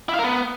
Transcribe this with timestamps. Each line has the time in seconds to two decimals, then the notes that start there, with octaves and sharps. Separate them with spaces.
0.09 E4
0.14 F5
0.19 A#4
0.24 B3